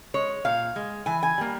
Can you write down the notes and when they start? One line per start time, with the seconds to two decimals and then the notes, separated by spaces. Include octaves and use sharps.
0.14 G#3 C#5
0.45 A#2 F5
0.76 G#3
1.06 E3 G#5
1.23 G#5
1.38 G3 A#3